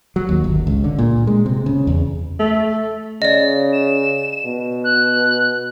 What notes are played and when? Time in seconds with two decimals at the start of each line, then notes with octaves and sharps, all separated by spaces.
0.16 F#3
0.29 D#2
0.44 G1
0.67 C#2
0.84 D3
0.98 A#2
1.27 G#3
1.46 C3
1.66 C#3
1.87 E2
2.40 A3
3.22 C#3 D5 D#5
3.73 E7
4.45 B2
4.84 F#6